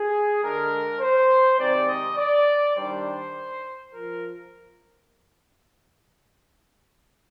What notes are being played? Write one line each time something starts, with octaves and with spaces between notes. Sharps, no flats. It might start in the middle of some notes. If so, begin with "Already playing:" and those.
Already playing: G#4
D3 G#3 D4 A#4
C5
C3 D#3 G#3 C4 D5
D#5
D5
D#3 G3 D4 C5
F3 A#4